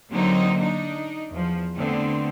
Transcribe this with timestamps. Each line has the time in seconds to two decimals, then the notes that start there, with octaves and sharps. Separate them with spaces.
0.12 D3 F#3 A#3 C4 D#4
0.59 D4 D#4
1.30 E2 F3
1.76 D3 A3 B3 C4